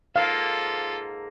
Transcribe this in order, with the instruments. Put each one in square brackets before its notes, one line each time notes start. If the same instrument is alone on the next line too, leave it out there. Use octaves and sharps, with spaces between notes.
[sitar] G#2 A#3 [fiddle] F4 A4 [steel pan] F5